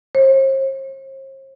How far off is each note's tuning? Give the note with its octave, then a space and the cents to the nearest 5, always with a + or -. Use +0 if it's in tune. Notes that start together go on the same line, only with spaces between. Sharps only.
C5 +45